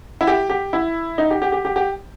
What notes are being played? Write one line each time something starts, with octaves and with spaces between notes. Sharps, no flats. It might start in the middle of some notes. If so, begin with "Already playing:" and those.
E4
G4
G4
E4
D#4
G4
G4
G4
G4
G4